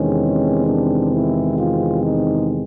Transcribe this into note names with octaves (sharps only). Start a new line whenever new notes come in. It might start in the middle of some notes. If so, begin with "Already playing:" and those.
Already playing: E2 C3 D#3 G#3 C4 C#4
D4
E4
F4
D#4